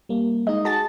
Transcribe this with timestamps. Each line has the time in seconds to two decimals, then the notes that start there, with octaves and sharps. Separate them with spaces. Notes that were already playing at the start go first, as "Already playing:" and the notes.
0.09 G3 A#3
0.47 G#3 D#4 D#5
0.65 F#4 G#4 A5 A6